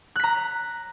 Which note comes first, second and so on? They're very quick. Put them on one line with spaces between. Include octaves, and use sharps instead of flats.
F#6 B6 A#5